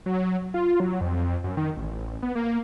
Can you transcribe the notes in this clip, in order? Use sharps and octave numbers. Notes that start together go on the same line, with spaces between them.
F#3
F4
F#3
F2
F#2
D#3
A1
B3
A#3